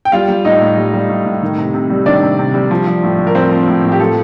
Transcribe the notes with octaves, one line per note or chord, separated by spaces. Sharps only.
G5
G3 F4 F5
G3
A2 D#4 D#5
A2
G3
G3
A2
A2
D#3
C3
C3
G3
D#3 D4 D5
C3
C3
G3
F3
F3
A2
A2
A#4
F3 C4 C5
F3
A2
A2
G4
F3 A4